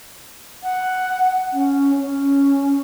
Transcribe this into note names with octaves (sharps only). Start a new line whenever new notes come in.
F#5
C#4
C#4